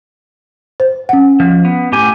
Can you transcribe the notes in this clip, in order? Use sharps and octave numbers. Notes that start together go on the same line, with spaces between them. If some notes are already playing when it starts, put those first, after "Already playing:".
C5
C#4 F#5
F3
B3
A2 G4 G#5